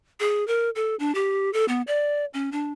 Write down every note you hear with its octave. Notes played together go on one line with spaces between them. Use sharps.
G#4
A#4
A4
D4
G4
A4
B3
D5
C#4
D4